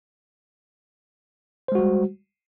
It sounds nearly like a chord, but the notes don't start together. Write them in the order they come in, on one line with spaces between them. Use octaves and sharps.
C5 G#3 F#4 G3